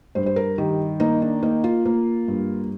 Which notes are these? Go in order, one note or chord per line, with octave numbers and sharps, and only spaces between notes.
G2 C5
C5
A#4
D#3 G4
A#3 D#4
D4
A#3 D#4
F4
A#3
G2